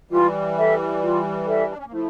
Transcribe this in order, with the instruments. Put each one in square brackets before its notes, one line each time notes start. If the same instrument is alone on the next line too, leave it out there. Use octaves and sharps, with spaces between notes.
[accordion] E3 G3 [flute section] F4
[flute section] A4 E5
F4
A4 E5
[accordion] D4
C#4
A#3
[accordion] F3 A3 [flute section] E4